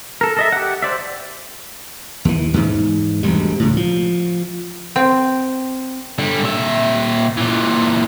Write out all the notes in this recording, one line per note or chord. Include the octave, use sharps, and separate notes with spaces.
A4 A#4
A4 D#5 E5
G4 F#5
C5 D5 E5
D#2 E3
E2 G#2
E1 D2 G3
C#2 A2
F3
C4
D3 G3
A#2 E5
A#2 E3